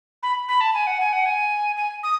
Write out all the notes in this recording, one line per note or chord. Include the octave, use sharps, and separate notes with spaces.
B5
B5
A5
G#5
F#5
G#5
F#5
G#5
G#5
D#6